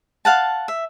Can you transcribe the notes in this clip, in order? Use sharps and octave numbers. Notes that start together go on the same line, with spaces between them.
F5 F#5 A5
E5